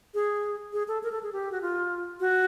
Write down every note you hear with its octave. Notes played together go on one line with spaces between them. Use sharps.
G#4
G#4
A4
A#4
A4
G#4
G4
F#4
F4
F#4